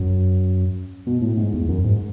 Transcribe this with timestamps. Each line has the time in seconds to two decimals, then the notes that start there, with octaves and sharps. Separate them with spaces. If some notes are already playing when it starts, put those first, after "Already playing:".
Already playing: F#2
1.07 B2
1.22 A2
1.38 G#2
1.54 E2
1.69 F#2
1.85 G#2